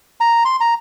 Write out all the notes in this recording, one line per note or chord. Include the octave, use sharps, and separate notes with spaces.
A#5
C6
A#5